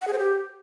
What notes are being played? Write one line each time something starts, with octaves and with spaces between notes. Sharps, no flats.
F#5
G#4
C5
G4